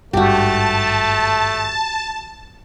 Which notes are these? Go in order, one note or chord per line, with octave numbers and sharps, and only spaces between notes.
G#1 G2 A3 F#4 G4 A5